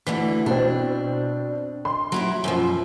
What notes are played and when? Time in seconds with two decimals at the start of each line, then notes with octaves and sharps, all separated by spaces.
0.07 D2 D3 E3 B6
0.46 B2 C4 D4
1.85 C6
2.12 F#3 E4 G4
2.44 F#2 B2 F3